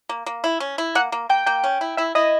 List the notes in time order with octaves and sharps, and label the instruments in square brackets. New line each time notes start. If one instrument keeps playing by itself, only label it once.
[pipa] A#3
A#3
E4
C#4
E4
[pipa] A#3 [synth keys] F#5
[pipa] A#3
[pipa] A#3 [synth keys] G5
[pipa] A#3 [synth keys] G5
[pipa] C#4
E4
[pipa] E4 [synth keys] E5
[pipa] E4 [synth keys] D#5